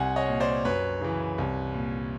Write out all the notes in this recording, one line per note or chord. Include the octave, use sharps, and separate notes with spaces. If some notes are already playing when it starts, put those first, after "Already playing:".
Already playing: C2 F#5 G#5
C#5 D#5
A#2
C5 D5
F#2 B4 C#5
C#3 E3
C2
A#2